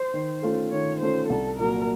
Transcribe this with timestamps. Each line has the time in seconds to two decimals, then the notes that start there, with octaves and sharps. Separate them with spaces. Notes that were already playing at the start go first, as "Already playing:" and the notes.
Already playing: C5
0.14 D#3
0.42 A3 C#4 F4 A4
0.72 D#3 C#5
1.01 A3 C#4 F4 A4 C5
1.29 C2 A4
1.59 A#2 F#3 A#4